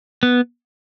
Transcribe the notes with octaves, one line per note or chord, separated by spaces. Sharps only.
B3